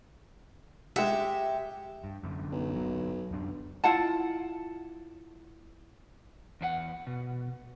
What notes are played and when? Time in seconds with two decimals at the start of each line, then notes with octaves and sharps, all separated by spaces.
0.96 G#3 G4 E5 F#5
2.04 G2
2.23 F#2 D3
2.52 B1
2.75 G1 F#3
3.31 D1 F#2 D4
3.84 E4 F4 F#5 A5
6.61 E2 D4 F#5
7.07 B2